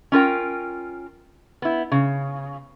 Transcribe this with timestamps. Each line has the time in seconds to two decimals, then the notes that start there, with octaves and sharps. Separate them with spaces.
0.12 C#4 F4 A#4 G5
1.62 B3 E4
1.92 C#3